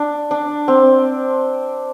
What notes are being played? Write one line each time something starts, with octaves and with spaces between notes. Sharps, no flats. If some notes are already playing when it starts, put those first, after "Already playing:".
Already playing: D4
D4
C4